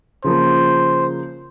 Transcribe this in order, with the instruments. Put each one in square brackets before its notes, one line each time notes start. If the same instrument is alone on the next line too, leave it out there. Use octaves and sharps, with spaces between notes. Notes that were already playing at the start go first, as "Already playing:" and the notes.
[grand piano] C#3 F3 A#3 [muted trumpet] C5